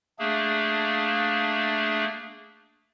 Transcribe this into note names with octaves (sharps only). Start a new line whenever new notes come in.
A3 A#3 D4 G#4